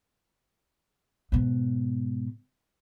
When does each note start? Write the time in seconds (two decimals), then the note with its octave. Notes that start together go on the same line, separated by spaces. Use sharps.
1.32 G#2 B2